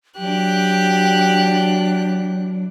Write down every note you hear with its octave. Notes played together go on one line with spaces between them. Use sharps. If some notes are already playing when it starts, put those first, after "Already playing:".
E3 F#3 D4 G4 F#6